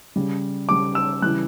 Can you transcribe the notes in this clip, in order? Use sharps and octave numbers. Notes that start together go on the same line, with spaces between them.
C#3 G3
C#3 G3 D6
E6
C#3 E3 G3 F#6